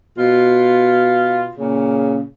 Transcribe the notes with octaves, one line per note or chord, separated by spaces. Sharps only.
B2 F4
A#2 C#3